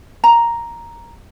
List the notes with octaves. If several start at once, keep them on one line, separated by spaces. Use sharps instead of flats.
A#5